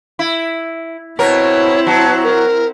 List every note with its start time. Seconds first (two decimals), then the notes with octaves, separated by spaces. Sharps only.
0.19 E4
1.19 B2 C4 E4 A#4 C#5
1.87 F#3 A5
2.24 A#4